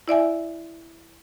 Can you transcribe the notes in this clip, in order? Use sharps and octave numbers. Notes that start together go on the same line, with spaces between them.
E4 D5 E5 G#5